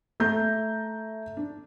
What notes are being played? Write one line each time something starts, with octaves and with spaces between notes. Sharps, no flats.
A3 A#5 G6
D4